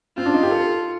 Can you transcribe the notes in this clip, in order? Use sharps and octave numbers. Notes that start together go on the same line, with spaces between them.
C4 F4
D4
D#4
G4
A4